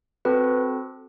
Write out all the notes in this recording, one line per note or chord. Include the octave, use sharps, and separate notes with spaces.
C4 F#4 A4 B4